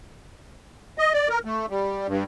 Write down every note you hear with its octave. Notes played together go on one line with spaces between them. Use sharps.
D#5
D5
A#4
A3
G3
G2